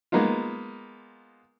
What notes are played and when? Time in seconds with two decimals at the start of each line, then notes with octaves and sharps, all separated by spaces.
0.12 G#3 A#3 B3 D#4 F4